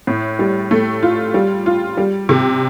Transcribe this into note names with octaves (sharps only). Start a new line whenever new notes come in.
A2
G3
A3
F4
G3
F4
G3
C3